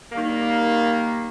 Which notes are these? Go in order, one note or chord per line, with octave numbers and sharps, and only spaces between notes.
D#3 G3 A#3